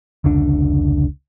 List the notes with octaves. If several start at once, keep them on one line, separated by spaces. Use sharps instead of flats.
F1 C#2 D3 D4